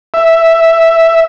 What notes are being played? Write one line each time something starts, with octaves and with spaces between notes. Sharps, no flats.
E5